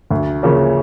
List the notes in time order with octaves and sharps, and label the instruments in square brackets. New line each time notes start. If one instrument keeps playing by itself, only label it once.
[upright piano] D2
C#3 F3 A#3 C#4